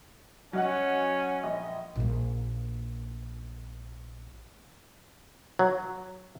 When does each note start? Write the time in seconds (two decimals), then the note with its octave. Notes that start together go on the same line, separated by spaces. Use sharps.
0.53 F#3 C#4 D#5 F#5
1.44 A#1 D#5
1.96 A#1 A#3
5.59 F#3